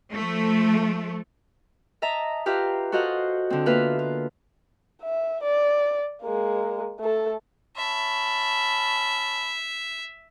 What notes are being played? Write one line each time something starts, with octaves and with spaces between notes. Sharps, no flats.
F3 A3
D#5 E5 A5 A#5
F4 G4 B4 E5 F5 A#5
F#4 A4 C5 D#5 F5 F#5
D3 C4
A#3 B3 F4 B4 E5 F5
F4
E5
D5
G#3 A#3
A3 A4
C#4 E5 A5 B5